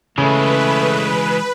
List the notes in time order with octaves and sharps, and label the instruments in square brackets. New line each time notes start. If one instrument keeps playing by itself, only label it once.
[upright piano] C#3 [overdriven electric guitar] E3 G#3 [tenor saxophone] A3 [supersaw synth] B4